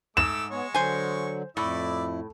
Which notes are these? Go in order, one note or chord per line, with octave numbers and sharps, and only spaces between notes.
G#2 A3 D6 E6 E7
G#3 B3 C#5 C#6
D3 F#3 C5 G#5
F2 A2 E4 D5 E5